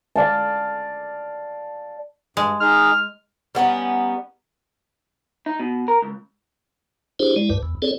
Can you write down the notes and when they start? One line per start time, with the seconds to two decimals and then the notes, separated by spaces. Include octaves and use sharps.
0.16 D5 F5 A5
2.37 G2 G#3
2.61 D#4 G#4 F6
3.55 G3 B3 C#4 D#4
5.46 D#4
5.59 B2
5.88 A#4
6.02 C#2
7.20 D4 E4 G4 G#4 C5
7.36 G#3 E4 D5
7.50 D2 G2 B4
7.63 E2
7.82 C4 G#4 A4 C#5 D5